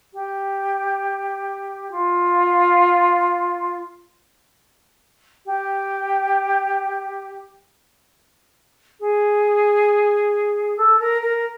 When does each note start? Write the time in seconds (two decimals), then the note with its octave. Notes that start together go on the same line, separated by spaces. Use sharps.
0.13 G4
1.91 F4
5.45 G4
9.00 G#4
10.77 A4
10.99 A#4
11.21 A#4